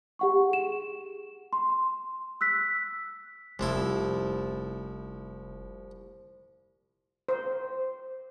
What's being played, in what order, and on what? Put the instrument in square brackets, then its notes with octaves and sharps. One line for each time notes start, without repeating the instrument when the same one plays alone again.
[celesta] G4 F#5 C#6
G#4 E7
C6
E6 F#6 B6
[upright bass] F1 C#4 [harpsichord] C2 F3 E4
[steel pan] C5